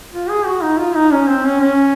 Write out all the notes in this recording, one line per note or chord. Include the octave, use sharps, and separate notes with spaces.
F4
G#4
F#4
D#4
F4
D#4
C#4
C4
C#4
C#4